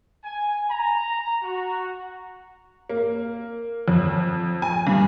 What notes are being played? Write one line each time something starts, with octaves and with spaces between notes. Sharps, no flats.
G#5
A#5
F#4
A#3
F2
G#5
G2